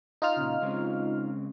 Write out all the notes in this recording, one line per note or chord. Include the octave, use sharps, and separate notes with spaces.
D#4 F4 F6
A#2 C#3
C#3 G#3 C4